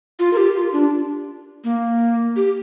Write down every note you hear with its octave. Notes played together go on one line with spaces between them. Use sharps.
F4
A#4
G4
F4
D4
A#3
G4